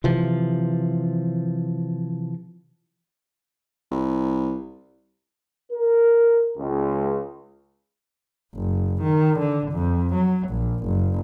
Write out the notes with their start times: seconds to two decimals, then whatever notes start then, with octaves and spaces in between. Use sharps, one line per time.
0.04 C3 E3 F3
3.91 C2
5.73 A#4
6.58 C#2
8.55 F#1
9.03 D#3
9.39 D3
9.72 F2
10.14 F#3
10.49 A#1
10.86 F#1